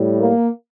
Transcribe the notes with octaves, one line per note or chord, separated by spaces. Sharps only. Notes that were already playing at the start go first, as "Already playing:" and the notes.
Already playing: A2 G3
A#3